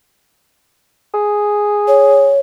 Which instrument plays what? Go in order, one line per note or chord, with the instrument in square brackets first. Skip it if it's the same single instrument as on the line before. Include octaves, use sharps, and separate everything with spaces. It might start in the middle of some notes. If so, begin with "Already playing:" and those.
[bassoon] G#4
[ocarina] C#5